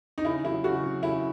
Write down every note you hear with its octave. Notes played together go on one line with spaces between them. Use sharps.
D#4
C#3 E4
F#3 E4
C#3 F#4
F#3
C#3 E4